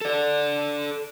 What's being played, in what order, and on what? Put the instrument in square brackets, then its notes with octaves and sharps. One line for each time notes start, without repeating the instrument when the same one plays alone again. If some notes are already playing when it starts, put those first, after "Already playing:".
[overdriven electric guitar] A4 D5